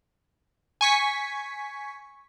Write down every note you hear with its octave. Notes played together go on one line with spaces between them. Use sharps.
G#5 C#6 B6